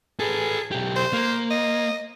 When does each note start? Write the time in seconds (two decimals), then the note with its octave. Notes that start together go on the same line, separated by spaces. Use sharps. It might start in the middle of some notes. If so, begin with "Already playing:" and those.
0.20 G#4 A4 B4
0.71 B1 G4
0.96 C5
1.13 A#3
1.51 D#5